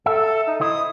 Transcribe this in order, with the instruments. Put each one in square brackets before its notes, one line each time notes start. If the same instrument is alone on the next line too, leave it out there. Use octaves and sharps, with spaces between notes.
[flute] A4 [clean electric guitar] E5
[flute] D#4
[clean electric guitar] E4 C5 D#5 [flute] D#6